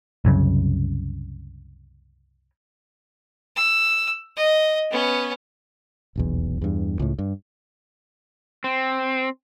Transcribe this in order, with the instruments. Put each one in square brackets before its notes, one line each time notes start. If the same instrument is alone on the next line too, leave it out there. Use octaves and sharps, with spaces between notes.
[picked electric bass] C2 F#2 C#3
[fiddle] E6
D#5
B3 C#4
[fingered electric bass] D#1 B1 E2
E2 G2
C#2 A2
G2
[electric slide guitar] C4